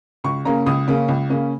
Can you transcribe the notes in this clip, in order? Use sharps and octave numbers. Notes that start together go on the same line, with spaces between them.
C#2 C#6
C#3 A#3 C#4 A#5
C#2 D#6
C#3 A#3 C#4
C#2
C#3 A#3 C#4